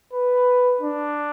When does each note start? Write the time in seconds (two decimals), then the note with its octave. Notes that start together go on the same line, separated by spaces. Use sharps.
0.13 B4
0.81 D4